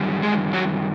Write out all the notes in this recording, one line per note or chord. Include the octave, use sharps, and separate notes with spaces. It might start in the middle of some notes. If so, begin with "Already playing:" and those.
Already playing: F#2 D#3 G3
G#3 G#4
F#3 F#4